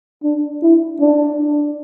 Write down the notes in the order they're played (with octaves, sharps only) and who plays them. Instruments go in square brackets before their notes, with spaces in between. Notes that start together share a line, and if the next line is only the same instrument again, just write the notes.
[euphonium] D4
E4
D4